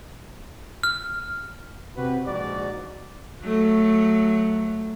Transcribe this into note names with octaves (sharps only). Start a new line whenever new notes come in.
F6
C3 F#4 G4 B4
A#1 G#2 F#4 D5
F#3 A3